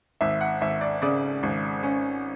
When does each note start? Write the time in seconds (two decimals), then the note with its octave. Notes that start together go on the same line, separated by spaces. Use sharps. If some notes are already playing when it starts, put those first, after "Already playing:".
0.21 G#1 E5
0.41 F#5
0.61 G#1 E5
0.81 D5
1.02 C#3 D5
1.43 G#1
1.83 C#4